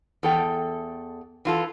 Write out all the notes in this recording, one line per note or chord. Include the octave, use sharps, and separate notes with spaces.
E2 A4 G5
E3 F4 A4